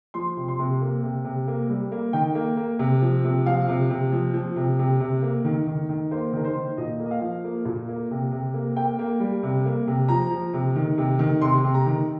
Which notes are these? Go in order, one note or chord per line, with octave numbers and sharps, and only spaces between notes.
F3 C6
C3
C6
C3
A#3
C3
C3
A#3
G3
A#3
D#3 G5
A#3
A#3
C3
F3
C3
F3 F5
C3
C3
F3
F3
C3
C3
C3
A#3
D#3
D#3
D#3
A#3 C5
D#3 A#4
C5
D#3
A#2 D#5
A#3
D#5
F5
F3
A#3
A#2
A#3
C3
C3
A#3
A#3 G5
A#3
G3
C3
A#3
C3
F3 A#5
F3
C3
D#3
C3
D#3
C3 C6
C3
A#5
D#3